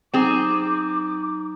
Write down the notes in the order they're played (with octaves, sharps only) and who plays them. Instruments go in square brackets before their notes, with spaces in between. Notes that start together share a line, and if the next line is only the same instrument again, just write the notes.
[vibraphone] F#3 D#4 A#5 [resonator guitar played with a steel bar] C4 G#4 [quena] D6